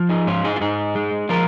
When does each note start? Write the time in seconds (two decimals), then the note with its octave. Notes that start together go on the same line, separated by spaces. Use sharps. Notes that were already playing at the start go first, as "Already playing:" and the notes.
Already playing: F3
0.09 D#4 G#4
0.27 G#2 C#4 F4
0.44 D#4 G#4
0.56 F4
0.61 G#2 D#4 G#4
0.95 G#3
1.29 F3 F4 A#4